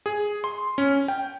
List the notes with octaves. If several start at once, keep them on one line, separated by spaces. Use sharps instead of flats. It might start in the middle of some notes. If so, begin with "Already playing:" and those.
G#4
C6
C#4
G5